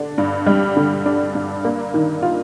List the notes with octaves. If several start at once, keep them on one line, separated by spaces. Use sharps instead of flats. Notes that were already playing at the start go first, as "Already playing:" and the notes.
Already playing: D3 D4
G2
G3
D3
D4
G2
A#3
D#3
F4